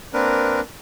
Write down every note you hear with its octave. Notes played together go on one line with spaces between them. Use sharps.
A#3 C4 D4 A#4 B4